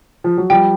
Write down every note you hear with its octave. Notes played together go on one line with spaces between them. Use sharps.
F3
F#3
F3 G3 G5